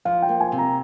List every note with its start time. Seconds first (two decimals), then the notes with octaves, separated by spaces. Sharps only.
0.05 F3 F5
0.22 G5
0.29 A#3
0.40 G#5
0.52 C3
0.58 A#5